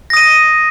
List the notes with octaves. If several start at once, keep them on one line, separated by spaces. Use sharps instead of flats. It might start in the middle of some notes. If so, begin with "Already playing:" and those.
D#6 A#6 D#7